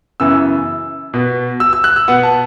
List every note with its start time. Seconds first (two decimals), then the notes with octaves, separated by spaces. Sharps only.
0.20 F#2 C#3 E3 B3 E6
1.14 B2 B3
1.60 E6
1.73 E6
1.84 F#6
1.96 E6
2.08 B2 B3 F#5
2.23 A5